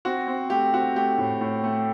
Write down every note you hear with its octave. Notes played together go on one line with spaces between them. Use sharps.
C4 F#4
C4
A3 G4
C4 F#4
A3 G4
A2
A2
A3